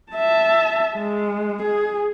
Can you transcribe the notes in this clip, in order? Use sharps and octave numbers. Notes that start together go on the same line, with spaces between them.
E5 A5
G#3
G#4